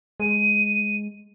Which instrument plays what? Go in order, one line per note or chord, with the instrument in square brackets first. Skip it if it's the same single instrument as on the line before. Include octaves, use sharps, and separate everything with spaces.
[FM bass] G#3 [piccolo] D#7